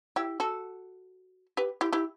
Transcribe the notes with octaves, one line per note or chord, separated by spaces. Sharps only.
E4 G4
F#4 A4
G4 B4
E4 G4
E4 G4